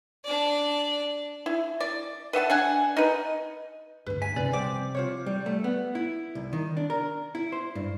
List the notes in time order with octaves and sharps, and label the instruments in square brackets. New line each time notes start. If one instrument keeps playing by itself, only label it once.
[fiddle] D4 D5
[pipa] E4
D5
B4 E5 F#5 A5
D4 F#5 G#5
D#4 B4
[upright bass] D2 G2 [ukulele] B4
[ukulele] G#5 [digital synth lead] B6
[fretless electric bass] C3 [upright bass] C#4 D#4 [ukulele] B4 [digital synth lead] D5
[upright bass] F3 G3 [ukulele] C5 G5 [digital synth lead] D6
[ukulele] F4 C5 C#5
[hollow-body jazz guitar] G3
A3
B3
E4
C2
D#3
D4
A#4
E4
C5
G2